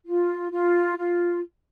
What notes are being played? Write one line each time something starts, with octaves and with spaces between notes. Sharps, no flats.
F4
F4
F4